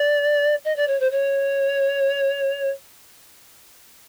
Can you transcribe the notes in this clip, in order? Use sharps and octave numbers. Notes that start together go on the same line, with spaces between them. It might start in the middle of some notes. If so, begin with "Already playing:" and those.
Already playing: D5
D#5
D5
C#5
C5
C#5